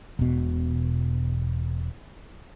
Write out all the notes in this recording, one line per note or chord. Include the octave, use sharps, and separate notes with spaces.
E1 B2